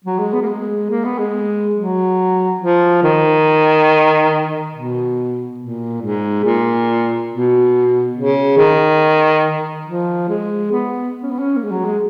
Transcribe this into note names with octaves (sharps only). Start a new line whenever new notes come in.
F#3
G#3
B3
A#3
G#3
A#3
B3
G#3
F#3
F3
D#3
B2
A#2
G#2
A#2
B2
C#3
D#3
F3
G#3
B3
C#4
B3
C#4
A#3
G#3
F#3
G#3